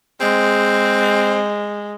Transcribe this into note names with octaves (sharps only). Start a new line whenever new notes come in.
G#3 C4